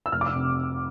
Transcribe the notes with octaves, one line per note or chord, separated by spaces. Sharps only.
E6
F1 F6
D6
E6
C3